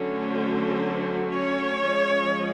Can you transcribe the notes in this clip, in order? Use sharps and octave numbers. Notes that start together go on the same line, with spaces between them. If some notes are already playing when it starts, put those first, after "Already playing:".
Already playing: D3 F#3 A3 C#4
C4 C5
C#4 C#5
F3 G#3 C#4